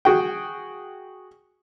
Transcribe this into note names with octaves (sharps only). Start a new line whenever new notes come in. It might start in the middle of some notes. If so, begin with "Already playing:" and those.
F#4 G#4 G5